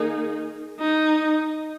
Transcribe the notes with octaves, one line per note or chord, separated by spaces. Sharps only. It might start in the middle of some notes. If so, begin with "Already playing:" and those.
Already playing: D#3 A#3 D#4 G#4
D#4